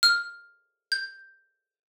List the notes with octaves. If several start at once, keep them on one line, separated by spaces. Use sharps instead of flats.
F6
G6